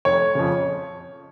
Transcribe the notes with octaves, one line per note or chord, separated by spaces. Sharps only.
F1 C#5
F2 C#3